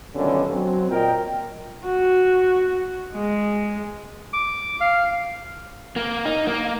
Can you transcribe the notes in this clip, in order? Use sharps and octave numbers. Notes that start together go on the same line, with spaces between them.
B1 G2 A#2 D3 D#3 C#4
F#3 C4
A#2 A#4 D#5 G5
F#4
G#3
D6
F5
A#3
D#4
A#3